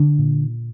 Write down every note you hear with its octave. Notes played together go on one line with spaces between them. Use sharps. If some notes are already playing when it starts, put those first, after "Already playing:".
Already playing: D3 D4
A#2